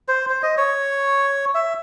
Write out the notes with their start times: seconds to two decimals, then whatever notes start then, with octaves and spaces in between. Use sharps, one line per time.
0.08 C5
0.30 C5
0.43 D#5
0.57 C#5
1.55 E5